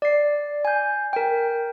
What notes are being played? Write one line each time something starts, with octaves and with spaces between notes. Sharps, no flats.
D5 C7
G#5 G6
A#4 G5